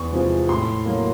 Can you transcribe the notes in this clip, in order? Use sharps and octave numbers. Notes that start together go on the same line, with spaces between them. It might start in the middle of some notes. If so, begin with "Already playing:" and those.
Already playing: E2 C#6
C3 F3 G#3
A2 C6
F#3 A#3